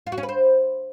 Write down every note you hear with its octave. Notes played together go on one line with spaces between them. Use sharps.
F4
F#4
C#4
B4
C5